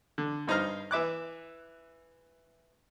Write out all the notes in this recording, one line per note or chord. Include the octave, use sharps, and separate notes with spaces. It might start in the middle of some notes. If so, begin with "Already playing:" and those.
D3
G2 D#4 C5 A#5 F6
E3 E5 D6 F#6